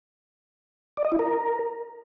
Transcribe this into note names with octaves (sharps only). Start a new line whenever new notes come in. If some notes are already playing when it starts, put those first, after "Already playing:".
D5
D#5
E4
A#4